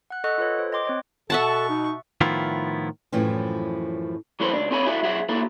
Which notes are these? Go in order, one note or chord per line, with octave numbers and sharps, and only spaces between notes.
F#5 F#6
A4 D#5 F#5 C#6 E6 F#6
F4 A4 B4 C#5
C5
D#5 G5 C6 D6
C4 C#5 D#5
B2 A4 E5 F#5 A5 C#6
D#4
A2 D#3 F3 B3 E4 F4
F#2 A2 E3 F3 C4
E3 F#3 A3 A4 B4 C5
C#2 D4
C4 A4 C#5 G#5 B5
E4 F#4 A4 E5
B1 G#4 E5 F#5
A#3 E4 F#4 A4